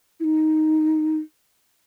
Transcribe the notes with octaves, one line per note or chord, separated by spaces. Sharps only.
E4
D#4